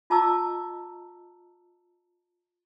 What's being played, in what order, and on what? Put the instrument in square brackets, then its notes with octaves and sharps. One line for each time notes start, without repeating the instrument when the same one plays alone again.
[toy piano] F4 D#5 A5 A#5 D6 E6